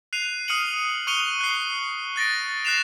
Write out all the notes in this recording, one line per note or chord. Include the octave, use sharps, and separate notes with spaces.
F#6 C7 D#7 F7
D#6 F6 C7 C#7 D#7 F#7
C#6 F#6 C#7 D#7 F7 G7
F#6 C7
F#6 A6 A#6 D7
F#6 A#6 C7 E7 F7